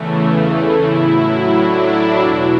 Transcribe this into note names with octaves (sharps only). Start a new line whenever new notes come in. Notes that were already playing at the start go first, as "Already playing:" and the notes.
Already playing: E2 C#3 E3 A3
E4
A2 F#3
D4
E4
E2 B2 F#3